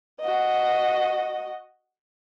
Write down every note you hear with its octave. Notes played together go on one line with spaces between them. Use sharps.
F#4 D#5